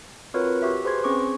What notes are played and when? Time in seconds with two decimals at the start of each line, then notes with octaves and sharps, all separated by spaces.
0.34 C4 F4 F#4 A#4 B4 C#5
0.62 F#4 G4 E5
0.84 G#4 B4 C5 C6 G#6
1.04 C4 C#4 G#4 C#6 D6